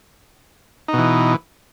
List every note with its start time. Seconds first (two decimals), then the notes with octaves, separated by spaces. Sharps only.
0.88 D#4
0.93 B2
0.98 E3